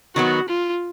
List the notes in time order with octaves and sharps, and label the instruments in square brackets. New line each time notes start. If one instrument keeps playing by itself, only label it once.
[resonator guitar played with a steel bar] D#3 F#3 B3 [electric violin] F#4
[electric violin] F4